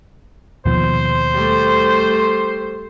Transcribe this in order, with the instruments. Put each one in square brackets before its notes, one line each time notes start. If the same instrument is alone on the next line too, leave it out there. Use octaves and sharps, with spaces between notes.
[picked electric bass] D#2 B2 F3 [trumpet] C5
[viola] G3 A3